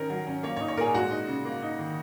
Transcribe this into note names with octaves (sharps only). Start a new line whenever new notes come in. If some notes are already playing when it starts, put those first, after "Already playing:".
Already playing: D#3 C#4 A#4
F#3
C#4
A#3 C#5
C#5
D#4
C#5
A#2 G#4 A#4
G#3 F#4
D#4
C#3
A#3
D#4
D#3